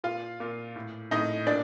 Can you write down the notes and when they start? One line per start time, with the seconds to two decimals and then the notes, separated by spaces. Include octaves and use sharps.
0.04 A#2 F4 F5
0.40 A#2
0.76 A2
1.11 A2 D#4 D#5
1.47 A#2 D4 D5